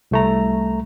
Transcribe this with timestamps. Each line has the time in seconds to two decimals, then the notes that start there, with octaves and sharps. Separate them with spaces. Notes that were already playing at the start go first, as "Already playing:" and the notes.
0.11 C2 A3 A#5